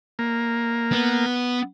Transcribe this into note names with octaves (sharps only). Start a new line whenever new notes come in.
A#3
B3